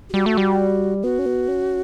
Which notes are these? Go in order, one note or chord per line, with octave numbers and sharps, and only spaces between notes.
G4
G3 F#4
A3
G3
B3 F#4
C#4
B3
C#4